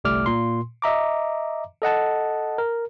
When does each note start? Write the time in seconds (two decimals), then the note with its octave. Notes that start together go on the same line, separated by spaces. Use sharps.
0.04 G1 C2 G3 A3 D6 F6
0.26 A#2 C6
0.82 D#5 E5 A#5 D6
1.82 A4 D#5 F#5 A5
2.58 A#4